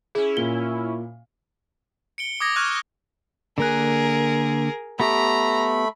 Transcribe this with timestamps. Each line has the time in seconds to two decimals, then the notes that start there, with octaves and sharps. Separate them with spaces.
0.15 C#4 E4 G#4
0.37 A#2 G7
2.18 C#7 D7 G7
2.40 D6 D#6 G#6 A#6
2.56 C#6 F6 F#6 G#6
3.58 D3 A#3 G#4 A#4 F#6
5.00 A3 B3 G4 A#5 B5 D6